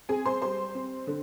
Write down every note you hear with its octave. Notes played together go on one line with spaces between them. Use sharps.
C4 G#4 G#5
C5 C6
G3 C5 C6
C4
D3